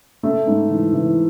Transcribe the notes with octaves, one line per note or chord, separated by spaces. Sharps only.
A3
G#2
E3
E3